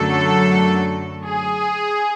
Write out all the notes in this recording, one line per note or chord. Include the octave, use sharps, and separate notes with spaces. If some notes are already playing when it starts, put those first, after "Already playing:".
Already playing: F#2 D3 F#3 A3 A4
G#4